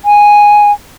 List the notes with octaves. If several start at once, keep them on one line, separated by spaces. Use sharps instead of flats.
G#5